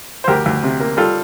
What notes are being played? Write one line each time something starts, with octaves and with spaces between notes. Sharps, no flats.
C5
D2 G4 A#4
D2
C3
A#3
G3 F4 A4